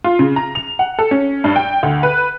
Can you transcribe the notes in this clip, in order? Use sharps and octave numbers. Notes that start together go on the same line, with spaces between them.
F4
C#3
A#5
F7
F#5
A4
C#4
G2
G5
D2
B4